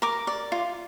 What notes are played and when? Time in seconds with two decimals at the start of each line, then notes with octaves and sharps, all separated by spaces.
0.02 A#4 D6
0.27 D5
0.52 F4